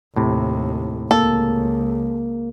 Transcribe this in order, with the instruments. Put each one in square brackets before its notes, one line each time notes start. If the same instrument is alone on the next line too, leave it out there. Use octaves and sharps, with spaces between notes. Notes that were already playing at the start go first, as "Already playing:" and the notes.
[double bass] D#2 [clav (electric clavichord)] A2 C3
[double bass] C#2 [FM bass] A#3 [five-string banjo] A4